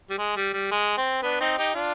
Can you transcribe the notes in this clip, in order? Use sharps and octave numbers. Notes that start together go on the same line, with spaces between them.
G3
G#3
G3
G3
G#3
C4
B3 D4
C4 D#4
D#4 G4
D4 F4